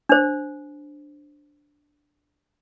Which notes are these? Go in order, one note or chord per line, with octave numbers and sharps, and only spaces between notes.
D4 C5